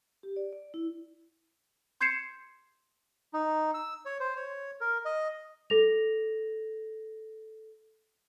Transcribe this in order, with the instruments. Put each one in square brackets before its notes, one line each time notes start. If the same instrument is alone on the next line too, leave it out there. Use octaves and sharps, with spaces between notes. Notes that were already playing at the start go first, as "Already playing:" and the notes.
[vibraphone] G4
D5
D5
E4
[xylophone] C6 G6 G#6 C7 C#7 E7
[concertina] D#4
E6
C#5
C5
C#5
A#4
D#5
[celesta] A4 A#6 F7